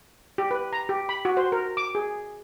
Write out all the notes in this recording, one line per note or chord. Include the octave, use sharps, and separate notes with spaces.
G4
B4
A#5
G4
B5
F#4
C5
A#4
D6
G#4